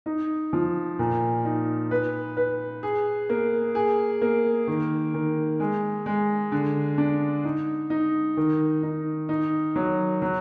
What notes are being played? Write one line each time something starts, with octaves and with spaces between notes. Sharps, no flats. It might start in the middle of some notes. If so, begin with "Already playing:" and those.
D#4
F3
A#2
D#4
B4
B4
G#4
A#3
G#4
A#3
D#3
D#3
G#3
G#3
D3
D4
D#4
D#4
D#3
D#4
D#4
F#3
F#3